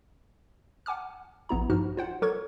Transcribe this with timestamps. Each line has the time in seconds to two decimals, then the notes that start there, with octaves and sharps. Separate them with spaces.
0.86 F#5 G#5 D6 F6
1.49 A#1 B3 E4 A#5
1.70 G2 F3 D#4 F#4 F6
1.97 F4 C5 F#5
2.22 F#3 A4 A#4 C#6 G#6